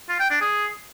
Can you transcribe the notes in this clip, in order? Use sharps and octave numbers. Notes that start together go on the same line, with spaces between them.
F4
G5
D4
G#4